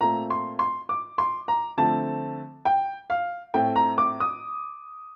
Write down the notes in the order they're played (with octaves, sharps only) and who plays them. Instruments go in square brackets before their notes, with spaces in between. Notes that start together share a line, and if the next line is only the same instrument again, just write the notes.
[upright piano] A#2 A3 C4 A#5
C6
C6
D6
C6
A#5
D3 F3 A3 C4 A5
G5
F5
A2 A3 C4 G5
A#5
D6
D#6